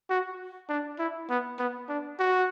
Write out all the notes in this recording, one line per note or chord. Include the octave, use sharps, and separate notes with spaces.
F#4
D4
E4
B3
B3
D4
F#4